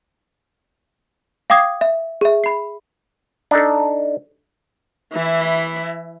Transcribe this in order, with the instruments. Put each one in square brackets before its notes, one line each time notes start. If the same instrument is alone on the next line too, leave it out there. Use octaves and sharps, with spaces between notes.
[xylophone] F5 G5 D6 D#6 G#6 C7
E5
G#4 E5
B5 C7
[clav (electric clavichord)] D4 D#4 A4
[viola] E3 E4